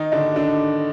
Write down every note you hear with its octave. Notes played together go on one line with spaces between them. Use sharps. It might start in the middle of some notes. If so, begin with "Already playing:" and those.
Already playing: D#3 D#4
D3 D4
D3 D4